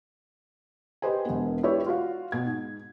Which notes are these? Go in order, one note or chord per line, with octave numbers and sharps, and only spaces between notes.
G4 B4 C5 D#5 G#5
E1 B3
E4 G4 B4 C#5 D5 E5
F4 F#4 F5
B2 G#6
G#2